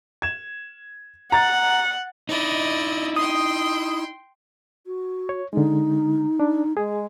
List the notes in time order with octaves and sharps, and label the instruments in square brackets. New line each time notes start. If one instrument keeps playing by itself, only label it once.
[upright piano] G#6 E7
[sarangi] F#5 [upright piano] A#5 A6
[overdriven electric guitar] D#4 E4 [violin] D5 D#5
[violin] G5 C6 [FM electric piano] D#6
[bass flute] F#4
[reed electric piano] C#5
[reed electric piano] D3 G#3 [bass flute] D#4
[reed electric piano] D4
[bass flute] G#3 [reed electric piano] G#4